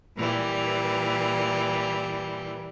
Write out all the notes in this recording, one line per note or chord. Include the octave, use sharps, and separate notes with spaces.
A#2 E3 G3